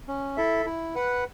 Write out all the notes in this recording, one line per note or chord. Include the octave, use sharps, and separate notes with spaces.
C#4
E4 A4 E5
E4
B4 F#5